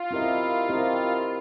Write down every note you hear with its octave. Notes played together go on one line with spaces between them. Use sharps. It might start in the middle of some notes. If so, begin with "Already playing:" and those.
Already playing: F4
C4 E4 G4 A#4 D#5
C4 E4 G4 A#4 D#5